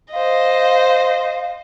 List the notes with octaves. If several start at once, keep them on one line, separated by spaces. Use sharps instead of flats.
C5 D#5 F5